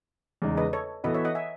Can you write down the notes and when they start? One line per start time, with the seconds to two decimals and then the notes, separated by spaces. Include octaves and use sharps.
0.42 E2 C#3 G#3 D#4
0.57 B4 D#5
0.73 A4 C#5
1.04 E3 B3 F#4 A4 B4 D#5
1.14 C#5 E5
1.25 D#5 F#5
1.35 E5 G#5